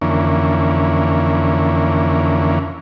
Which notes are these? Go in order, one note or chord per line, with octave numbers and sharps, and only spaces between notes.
F2 D3 E3 A#3 C#4